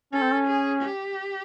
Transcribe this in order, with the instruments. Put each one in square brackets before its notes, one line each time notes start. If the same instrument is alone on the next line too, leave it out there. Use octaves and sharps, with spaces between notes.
[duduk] C#4 [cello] A4
[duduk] C4
C#4
[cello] G#4
G4